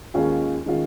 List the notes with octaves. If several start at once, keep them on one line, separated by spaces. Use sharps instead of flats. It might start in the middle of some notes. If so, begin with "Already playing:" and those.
D#2 D#3 G#3 C#4 F4
D#3 G#3 C#4 F4